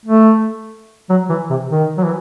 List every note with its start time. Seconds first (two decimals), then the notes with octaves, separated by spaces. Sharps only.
0.06 A3
1.10 F#3
1.29 E3
1.50 C3
1.71 D#3
1.97 F#3
2.04 E3